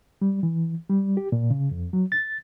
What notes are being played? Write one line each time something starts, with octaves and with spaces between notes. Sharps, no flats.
G3
E3
G3
G4
A#2
C#3
F2
F#3
A6